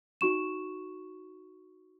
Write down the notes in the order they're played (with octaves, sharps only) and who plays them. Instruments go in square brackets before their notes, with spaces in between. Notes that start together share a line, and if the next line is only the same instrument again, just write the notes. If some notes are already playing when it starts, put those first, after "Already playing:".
[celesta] D#4 F#4 C#6 E7